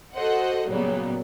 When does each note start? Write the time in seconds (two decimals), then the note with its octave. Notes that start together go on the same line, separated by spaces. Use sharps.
0.15 F#4 A4 C5 D#5 F#5
0.68 A#2 C#3 F#3 G3 A#3 B3